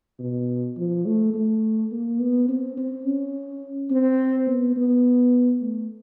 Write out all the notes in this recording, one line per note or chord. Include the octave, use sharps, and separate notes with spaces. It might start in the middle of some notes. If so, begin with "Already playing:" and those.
B2
F3
A3
A3
A#3
B3
C4
C4
C#4
C4
B3
B3
A3